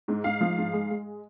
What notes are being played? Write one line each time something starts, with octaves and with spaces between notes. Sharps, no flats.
G#2
G#2 F5
F3
G#2
G#3
G#3